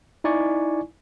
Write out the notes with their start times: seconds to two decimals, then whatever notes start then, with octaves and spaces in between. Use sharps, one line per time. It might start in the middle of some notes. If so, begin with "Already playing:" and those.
0.24 D#4 E4 D5 G#5 C#6